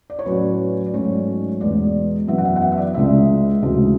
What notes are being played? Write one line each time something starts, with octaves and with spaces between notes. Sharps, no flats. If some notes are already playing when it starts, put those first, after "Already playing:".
D5
C#5
A2 F#3 C#4 B4
D5
G#2 F#3 A3 C#4 C#5
E2 B2 G#3 B3 D5
F#2 E3 B3 E5
F#5
E5
F#5
E5
E5
D5
C#2 C#3 G#3 E5
D2 C#3 E3 G#3